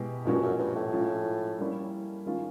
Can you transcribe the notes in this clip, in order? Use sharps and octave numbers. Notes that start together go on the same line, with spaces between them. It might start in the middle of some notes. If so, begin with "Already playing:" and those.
Already playing: B2 G#3 B3 E4 G4
G2 A#2 F3 G#3 C#4 F#4
F#2
G2
A2
F3 G#3 C#4 F4
G3 A#3 C#4 E4
D#3 G#3 C#4 F4